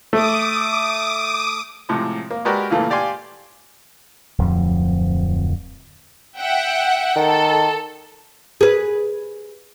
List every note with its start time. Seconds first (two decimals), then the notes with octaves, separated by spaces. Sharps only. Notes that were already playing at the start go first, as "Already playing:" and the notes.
0.13 A3 D6 D#6
1.89 A2 C3 F3 G#3
2.31 A#3
2.45 G#3 F#4 G4 A#4 B4 D5
2.70 A#2 C#3 E3 A3 A#3
2.90 G4 D5 F5 G#5 C6 D6
4.38 D1 F2 F3
6.38 E5 F#5 G5
7.16 D#3 A4
8.61 G#4 B4